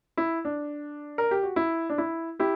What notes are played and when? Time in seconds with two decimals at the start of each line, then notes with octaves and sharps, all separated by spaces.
0.17 E4
0.45 D4
1.18 A#4
1.31 G4
1.43 F#4
1.56 E4
1.90 D4
1.98 E4
2.39 E4 G4